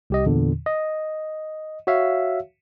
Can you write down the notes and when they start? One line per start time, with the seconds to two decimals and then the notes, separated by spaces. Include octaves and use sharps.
0.10 C2 G4 D#5
0.26 E2 A#2 D3
0.66 D#5
1.87 F#4 C#5 E5 F5